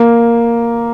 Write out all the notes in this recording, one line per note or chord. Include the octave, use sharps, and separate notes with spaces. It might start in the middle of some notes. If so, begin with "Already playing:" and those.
Already playing: A#3